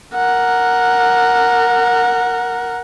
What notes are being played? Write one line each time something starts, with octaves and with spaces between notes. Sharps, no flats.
A#4 F#5